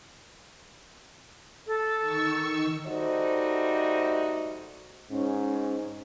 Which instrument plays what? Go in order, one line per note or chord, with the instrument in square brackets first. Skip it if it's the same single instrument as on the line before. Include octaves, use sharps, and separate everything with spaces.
[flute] A4
[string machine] D#3 C#6 E6
[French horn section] G3 A3 D#4 F#4 C5 D#5
[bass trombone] G#2 [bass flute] C#4